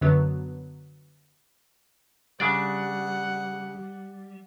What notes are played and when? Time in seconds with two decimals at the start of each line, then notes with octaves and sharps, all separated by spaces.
0.01 F#2 D3 F#3 B3
2.40 C#3 G3 D4 D5 F#5